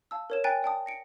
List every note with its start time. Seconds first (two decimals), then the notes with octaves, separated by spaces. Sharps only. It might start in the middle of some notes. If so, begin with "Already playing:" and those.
0.11 F5 A5 E6
0.30 A#4 C#5 E7
0.44 G5 G#5 A#5 F#6 A6
0.63 D5 G5 A5 D#6
0.86 A#6 C#7 D7